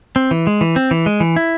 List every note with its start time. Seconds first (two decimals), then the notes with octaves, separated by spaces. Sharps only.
0.16 C4
0.31 E3
0.47 G#3
0.61 E3
0.76 C4
0.91 E3
1.06 G#3
1.20 E3
1.36 E4